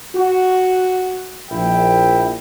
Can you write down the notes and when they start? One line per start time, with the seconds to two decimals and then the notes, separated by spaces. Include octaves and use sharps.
0.15 F#4
1.51 A#1 E4 G5